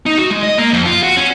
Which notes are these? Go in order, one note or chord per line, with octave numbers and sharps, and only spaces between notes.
D#4
F#4
G#3
D#5
A#3
F2
F4
F#4
C#4